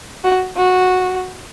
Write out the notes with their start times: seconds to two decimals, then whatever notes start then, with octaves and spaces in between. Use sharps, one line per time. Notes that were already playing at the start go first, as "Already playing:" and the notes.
0.24 F#4
0.57 F#4